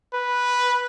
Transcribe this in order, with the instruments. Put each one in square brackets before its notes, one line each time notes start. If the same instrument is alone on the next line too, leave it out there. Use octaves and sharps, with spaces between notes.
[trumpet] B4